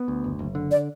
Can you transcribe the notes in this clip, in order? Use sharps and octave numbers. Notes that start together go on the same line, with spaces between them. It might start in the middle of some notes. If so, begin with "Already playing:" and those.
Already playing: B3
D2
F#1
F#1
D3
D5